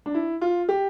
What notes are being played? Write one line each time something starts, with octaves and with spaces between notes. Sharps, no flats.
D4
E4
F4
G4